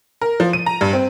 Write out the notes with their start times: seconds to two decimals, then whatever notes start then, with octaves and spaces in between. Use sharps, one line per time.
0.22 A#4
0.40 F3
0.53 D#7
0.66 A#5
0.81 G2
0.93 C4